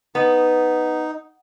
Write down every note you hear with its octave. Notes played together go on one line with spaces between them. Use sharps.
B3 D#4